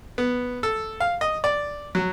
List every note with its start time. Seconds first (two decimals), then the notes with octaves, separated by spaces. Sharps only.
0.18 B3
0.63 A4
1.00 F5
1.21 D#5
1.44 D5
1.95 F#3